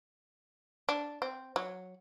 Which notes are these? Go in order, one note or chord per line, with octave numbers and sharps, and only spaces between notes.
D4
C4
F#3